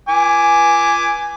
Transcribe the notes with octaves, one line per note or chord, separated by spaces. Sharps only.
G#5 D6